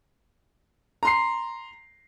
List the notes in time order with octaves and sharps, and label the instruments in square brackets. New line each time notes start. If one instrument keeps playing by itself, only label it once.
[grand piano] A#5 C6 C7